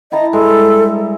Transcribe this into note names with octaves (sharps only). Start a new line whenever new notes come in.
E4 D#5 A5 A#5
G2 G#3 A4 A#5